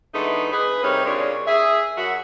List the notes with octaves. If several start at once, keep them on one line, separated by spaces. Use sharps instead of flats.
E3 G#3 A3 B3 D4 D#4
G#4 B4
C3 G3 C4 D#4 A#4 C#5
A#2 C#3 G3 G#3 D4 C#5
G#4 E5
F#2 F#4 E5